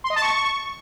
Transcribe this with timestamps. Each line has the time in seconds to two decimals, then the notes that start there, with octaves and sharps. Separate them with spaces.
0.04 C6
0.10 D#5
0.16 A5
0.22 C#6